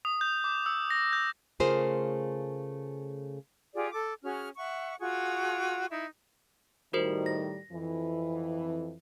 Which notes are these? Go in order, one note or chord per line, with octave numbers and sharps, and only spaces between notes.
D#6
G6
D6
E6
A#6
G6
C#3 A3 F4 G#4 A#4 C5
F4 G4 G#4 D5
A4 D6
C#4 F#4 G#4 F6
E5 F#5 C#6
F4 F#4 G#4 C#6
D#4 E4
A2 D#3 G3 F#4 A#4 C5
A#6
F2 E3